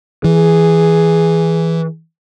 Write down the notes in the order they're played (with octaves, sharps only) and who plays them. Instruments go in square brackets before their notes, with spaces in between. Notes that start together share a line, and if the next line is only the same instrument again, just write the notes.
[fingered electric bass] E3 [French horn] G#4